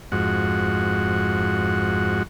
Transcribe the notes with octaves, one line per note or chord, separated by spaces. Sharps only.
F2 G#2 F#4